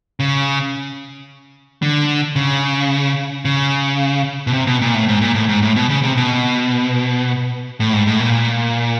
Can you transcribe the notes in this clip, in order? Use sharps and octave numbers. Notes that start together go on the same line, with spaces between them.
C#3
D3
C#3
C#3
B2
C3
B2
A#2
A2
G#2
A#2
A2
G#2
A2
B2
C#3
C3
B2
A2
G#2
A2
A#2